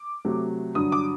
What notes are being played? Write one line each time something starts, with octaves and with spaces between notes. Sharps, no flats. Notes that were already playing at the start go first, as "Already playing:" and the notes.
Already playing: D6
C3 F#3 A3
G2 D3 F#3 D#6
D6